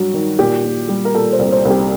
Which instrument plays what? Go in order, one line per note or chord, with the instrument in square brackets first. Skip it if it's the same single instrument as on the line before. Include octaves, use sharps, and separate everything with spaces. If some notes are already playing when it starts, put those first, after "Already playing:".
Already playing: [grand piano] G2 F#3 F#4
D#3
A#2 G4
A#2
G3
A#4
A#2 A4
C5
C2
C5
C2
G4